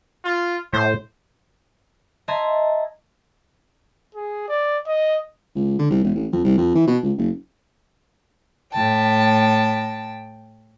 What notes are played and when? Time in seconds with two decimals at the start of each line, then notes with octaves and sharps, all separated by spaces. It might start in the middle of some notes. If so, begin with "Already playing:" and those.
0.24 F4
0.73 A2 C5
2.28 D#5 E5 A5 A#5 C6 G#6
4.15 G#4
4.48 D5
4.87 D#5
5.55 C#2
5.79 D3
5.90 C2
6.04 E1
6.15 A1
6.32 F2
6.44 C2
6.58 F2
6.75 E3
6.87 B2
7.03 C#2
7.18 F#1
8.73 A2 G5 A5